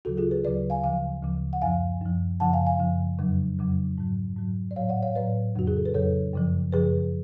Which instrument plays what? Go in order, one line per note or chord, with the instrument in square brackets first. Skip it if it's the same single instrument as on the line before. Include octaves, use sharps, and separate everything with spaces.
[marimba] D2 C#3 F#3 F#4 A4
F4 G#4
G#4 B4
D2 C#3 F#3 B4 D5
F5 G#5
D2 C#3 F3 F5 G#5
D2 C#3 F3
F#5
F#2 F3 F5 G#5
F#2 F3
F#2 C#3 F3 F#5 A5
F5 G#5
F5 G#5
F#2 C#3 F3
F2 C#3 F#3
F2 C#3 F#3
G#2 F#3
G#2 F#3
D5
A2 F#3 C#5 F5
D5 F#5
C#5 F5
A2 F#3 B4 D5
F2 C#3 F#3 F#4
G#4
A4
B4
F2 C#3 F#3 A4 C#5
F#2 C#3 F3
F#2 C#3 F3 G#4 B4